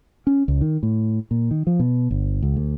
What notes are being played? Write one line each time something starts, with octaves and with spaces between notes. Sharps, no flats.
C#4
C#2
D#3
A2
A#2
D#3
F3
B2
G1
C#2
D2